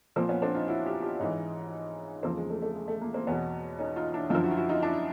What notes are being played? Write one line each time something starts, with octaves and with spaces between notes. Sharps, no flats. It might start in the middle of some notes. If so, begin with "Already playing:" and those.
A#2 F3 A#3 C4
B3 C#4
C4 D4
D#4 F4
E4 F#4
F4 G4
F4 G4
G#2 E3 C#4 D#4
E2 C#3 F3 A#3 C4
G#3
A3
A3
G#3
A3
G#3 A#3
A#3 C4
E2 B2 B3 C#4
C#4 D#4
D#4 F4
D4 E4
F#2 D3 F3 D#4 F4
E4 F#4
F4
E4 F#4
D#4 F4
D4 E4